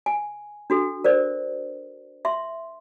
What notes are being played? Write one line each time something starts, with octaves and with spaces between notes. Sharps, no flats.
G#5
D4 F#4 A4
A#4 C5 D5
E5 C6